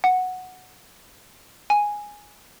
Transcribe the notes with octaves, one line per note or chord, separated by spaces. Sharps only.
F#5
G#5